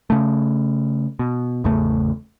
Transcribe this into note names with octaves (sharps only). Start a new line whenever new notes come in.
C#3 A3
B2
G#1 E2 C#3 A3